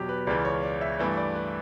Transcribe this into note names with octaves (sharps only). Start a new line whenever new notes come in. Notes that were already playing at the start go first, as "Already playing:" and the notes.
Already playing: E2 B2 F#3 G4
B4
C#2 C#3 E3 D5
C#5
D5
E5
G2 E3 A3 D5
D5
B4